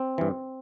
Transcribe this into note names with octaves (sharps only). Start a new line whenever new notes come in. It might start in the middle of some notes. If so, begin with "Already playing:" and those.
Already playing: C4
G2 E3